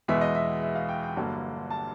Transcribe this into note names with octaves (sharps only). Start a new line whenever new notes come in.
E2 B2 G#3 B3 E5
D#5
E5
E5
F5
G5
G5
G1 G2 D3 F#3 A#3
A5